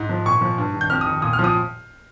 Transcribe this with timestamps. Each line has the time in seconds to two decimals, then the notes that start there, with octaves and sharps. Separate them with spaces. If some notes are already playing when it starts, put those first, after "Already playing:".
Already playing: G#2
0.09 F3
0.26 A#2 C#6
0.41 F3
0.58 G2
0.74 D#3
0.81 G6
0.90 F2 F6
1.01 D#3 D#6
1.22 A#2 D#6
1.33 F6
1.39 F3
1.44 D#6